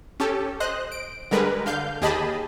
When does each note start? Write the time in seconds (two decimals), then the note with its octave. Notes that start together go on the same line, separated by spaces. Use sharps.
0.20 C#4 G4 A4
0.60 C5 D#5 F#6
0.92 D7
1.31 D3 G3 G#3 A#4 B4
1.66 D3 F5 G6
2.02 D#2 G4 G#4 D#5 A5 B5